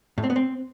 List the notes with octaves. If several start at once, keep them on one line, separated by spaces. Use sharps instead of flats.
A2
C4
B3
C4